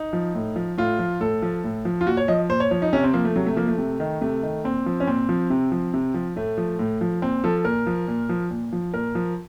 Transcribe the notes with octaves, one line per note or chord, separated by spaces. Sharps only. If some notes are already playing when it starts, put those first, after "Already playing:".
Already playing: D#4
F3
A2
F3
A2 F4
F3
A2 A4
F3
A2
F3
F4
A#2 F#4
C#5
F3 D#5
A#2 C5
C#5
F3 C#5
D#4
C3 C#4
C4
F3 A#3
A3
C3 F#3
A3
F3 A#3
A3
C3
D#3
C3 A3
D#3
A#2 C4
F3
C#4
A#2 C4
F3
C3
F3
C3
F3
A2 A3
F3
A2
F3
A#2 C4
F3 A4
A#2 A#4
F3
A#2
F3
A#2
F3
A#2 A#4
F3